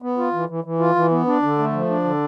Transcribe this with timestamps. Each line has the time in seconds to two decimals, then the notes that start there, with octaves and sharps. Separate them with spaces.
0.02 B3
0.18 F4
0.33 E3
0.49 E3
0.64 E3
0.80 F4
0.95 E3
1.11 B3
1.27 D4
1.43 D3
1.58 A3
1.73 F3
1.89 D4
2.04 D3